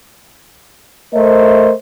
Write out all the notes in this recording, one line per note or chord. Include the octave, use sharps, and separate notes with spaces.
A3 A#4 C5 D#5